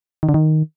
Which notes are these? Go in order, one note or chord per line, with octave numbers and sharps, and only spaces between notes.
D#3
D3
D#3